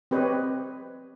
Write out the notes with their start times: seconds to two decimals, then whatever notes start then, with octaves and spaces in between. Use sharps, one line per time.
0.11 C4 G4 B4 C#5 D#5